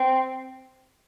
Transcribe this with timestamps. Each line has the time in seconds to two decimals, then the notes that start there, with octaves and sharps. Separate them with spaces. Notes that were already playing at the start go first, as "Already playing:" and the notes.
Already playing: C4